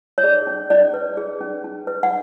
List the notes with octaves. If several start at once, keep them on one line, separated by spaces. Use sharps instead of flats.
C#5
G#4 D5
C#4
C#4 D5
B4
G#4
C#4
C#4
B4
F#5